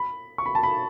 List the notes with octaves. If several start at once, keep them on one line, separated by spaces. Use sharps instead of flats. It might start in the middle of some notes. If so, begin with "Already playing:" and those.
Already playing: B5
C#6
B5
A5
B5